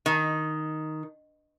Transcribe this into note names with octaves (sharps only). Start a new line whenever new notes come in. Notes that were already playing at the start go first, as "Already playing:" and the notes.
D#3